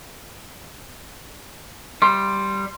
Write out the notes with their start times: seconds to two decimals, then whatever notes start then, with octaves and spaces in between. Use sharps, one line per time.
2.02 G3 C6